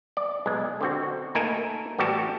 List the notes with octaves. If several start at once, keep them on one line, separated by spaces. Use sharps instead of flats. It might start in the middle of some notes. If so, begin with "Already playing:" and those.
D5
B1 G#3
D3 C4 F#4
A3 A#3 D#4 A4 A#4 G#5
A2 E3 G3 F#4 G4 A5